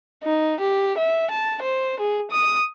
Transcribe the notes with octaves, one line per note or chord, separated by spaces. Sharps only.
D#4
G4
E5
A5
C5
G#4
D#6